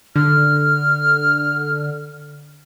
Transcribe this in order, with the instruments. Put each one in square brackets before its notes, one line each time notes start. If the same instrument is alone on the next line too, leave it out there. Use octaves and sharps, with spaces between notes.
[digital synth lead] D3 [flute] F6